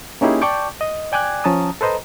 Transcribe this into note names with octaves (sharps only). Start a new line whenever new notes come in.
A#3 C#4 D#4 E4 G4 G#4
D5 G5 A5 C#6 D6 G6
D#5
D5 G5 G#5 D6 F#6 G#6
F3 C#4 A5 A#5 D#6
A4 B4 C5 D#5 A#5